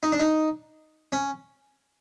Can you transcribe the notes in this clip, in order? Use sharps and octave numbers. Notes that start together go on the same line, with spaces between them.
D#4
D4
D#4
C#4